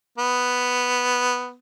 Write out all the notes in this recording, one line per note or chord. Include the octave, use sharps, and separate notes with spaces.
B3